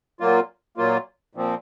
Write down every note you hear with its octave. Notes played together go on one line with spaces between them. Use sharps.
A#2 F#3 A#3 F4
A#2 F#3 A#3 F4
A#2 F3 C4